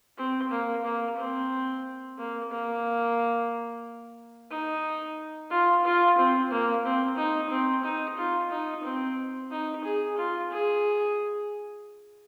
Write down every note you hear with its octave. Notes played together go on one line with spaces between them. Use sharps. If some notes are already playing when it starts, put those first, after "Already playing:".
C4
A#3
A#3
C4
A#3
A#3
D#4
F4
F4
C4
A#3
C4
D#4
C4
D#4
F4
D#4
C4
D#4
G#4
F4
G#4